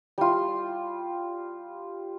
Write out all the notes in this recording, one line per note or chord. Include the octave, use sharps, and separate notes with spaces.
G3 F4